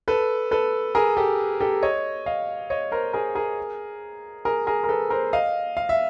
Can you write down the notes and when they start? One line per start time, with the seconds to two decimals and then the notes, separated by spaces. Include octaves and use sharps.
0.08 A4 B4
0.51 A4 B4
0.95 G#4 A#4
1.17 G4 A4
1.60 G4 A4
1.82 C#5 D#5
2.26 D#5 F5
2.70 C#5 D#5
2.92 A#4 C5
3.13 G#4 A#4
3.35 G#4 A#4
4.45 G#4 A#4
4.67 G#4 A#4
4.84 A#4
4.89 A4 B4
5.10 A#4 C5
5.33 D#5 F5
5.77 F5
5.89 E5